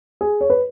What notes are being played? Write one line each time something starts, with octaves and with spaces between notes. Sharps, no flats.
G#4
C#5
B4